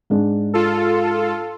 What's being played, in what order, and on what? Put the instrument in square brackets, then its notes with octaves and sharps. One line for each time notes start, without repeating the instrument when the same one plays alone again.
[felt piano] G#2 G#3 D4
[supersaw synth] F4 A4